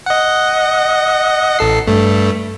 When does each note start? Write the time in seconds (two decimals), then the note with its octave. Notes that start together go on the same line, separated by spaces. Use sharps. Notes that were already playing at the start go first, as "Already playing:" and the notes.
0.06 D#5 F#5
1.59 A1 A4 C7
1.87 G2 A3